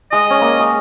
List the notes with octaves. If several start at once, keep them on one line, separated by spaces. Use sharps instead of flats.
G#3 D#5
C#4
A#3
G#3